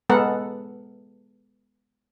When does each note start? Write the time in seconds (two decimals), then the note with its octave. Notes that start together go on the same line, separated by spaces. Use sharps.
0.09 G#3 B3 A4 A#4 F#5